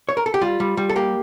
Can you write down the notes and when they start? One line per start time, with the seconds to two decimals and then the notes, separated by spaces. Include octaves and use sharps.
0.09 C#5
0.17 A#4
0.26 A4
0.34 G4
0.41 G3 F4
0.60 G3
0.77 G3
0.89 A4
0.96 A#3 G4